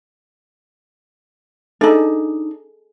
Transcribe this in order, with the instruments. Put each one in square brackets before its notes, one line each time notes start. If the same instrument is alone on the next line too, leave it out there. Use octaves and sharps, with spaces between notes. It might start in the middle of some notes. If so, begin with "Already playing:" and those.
[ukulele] D4 D#4 [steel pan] G#4 A4